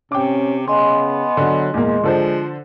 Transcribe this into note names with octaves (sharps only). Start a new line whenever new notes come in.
C3 C#4 G5 D6
C#3 B3 D#5 G#5 C6
D3 F#3
E2 A#2 G#3 A#3
D3 F3 A4 C5